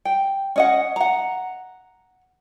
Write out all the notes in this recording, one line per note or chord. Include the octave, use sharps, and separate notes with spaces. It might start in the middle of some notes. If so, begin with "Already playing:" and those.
G5
C#4 D#5 F#5
F#5 A#5